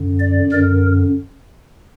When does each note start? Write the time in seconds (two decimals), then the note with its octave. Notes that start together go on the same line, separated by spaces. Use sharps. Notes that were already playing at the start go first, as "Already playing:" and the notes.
Already playing: F#2 D3
0.19 D5
0.52 F#2 D3 A#4